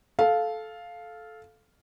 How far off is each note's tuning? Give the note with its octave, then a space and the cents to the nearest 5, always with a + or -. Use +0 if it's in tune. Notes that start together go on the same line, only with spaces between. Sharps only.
A4 -15 F5 +0